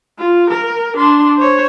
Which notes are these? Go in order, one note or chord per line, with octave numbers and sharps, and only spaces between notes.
F4
A#4
D4 C6
C5 C#5